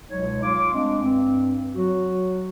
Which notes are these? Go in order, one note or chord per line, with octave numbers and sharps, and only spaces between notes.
C#2 B2 F#3 G#3 D#4 C#5
F4 F5 C6 D6
G#3 A3 C4 D4
G2 C4
F#3 F#4